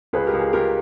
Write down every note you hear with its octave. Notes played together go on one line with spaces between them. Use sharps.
C#2 G#4 B4
G4 A#4
C#2
G#4
C#2 G4 A#4